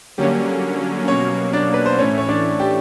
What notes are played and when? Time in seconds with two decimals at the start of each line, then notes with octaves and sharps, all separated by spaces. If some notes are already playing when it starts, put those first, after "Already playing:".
0.17 D3 F#3 G3 A#3 C#4 G4
1.08 B2 F#3 A#3 C#4 C#5
1.53 D4 D5
1.74 B4
1.86 C5
1.98 A2 E3 A3 C#4 C#5
2.18 C#5
2.29 D4 D5
2.60 G4 G5